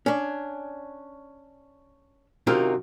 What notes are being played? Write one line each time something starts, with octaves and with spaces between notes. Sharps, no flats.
C#4 D4
F#2 C3 D#3 F4 A#4